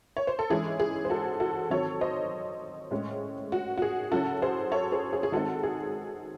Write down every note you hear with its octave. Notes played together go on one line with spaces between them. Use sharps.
C#5
C5
A4
E3 G#3 C#4 E4 G#4
G#4
C5
F#4 A4
F#4 A4
D#3 F#3 C4 A4 C#5
C5 D#5
A2 G#3 C#4
F#4
F#4
G#4
C#3 F#3 C#4 E4 F#4 A4
G#4 C5
A4 C#5
G#4 C5
G#4
G#4
D#3 G#3 C4 D#4 F#4 A4
G#4